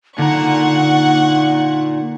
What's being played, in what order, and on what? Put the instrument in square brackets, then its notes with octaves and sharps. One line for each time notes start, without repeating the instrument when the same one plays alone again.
[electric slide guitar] A#2 A#5 [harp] D3 [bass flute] D#4 [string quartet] F#5 C#6